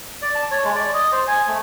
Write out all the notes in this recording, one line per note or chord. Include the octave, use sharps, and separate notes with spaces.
D5
A5
C#5
G#3
D5
D#5
C5
G#5
A3